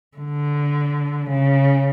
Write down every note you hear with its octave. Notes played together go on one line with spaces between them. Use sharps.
D3
C#3